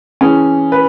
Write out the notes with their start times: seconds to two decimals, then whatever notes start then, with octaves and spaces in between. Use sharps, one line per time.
0.21 E3 C#4 G#4
0.72 B4